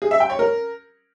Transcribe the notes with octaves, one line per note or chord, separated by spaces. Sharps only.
G#4
E5
G5
C#5
A#4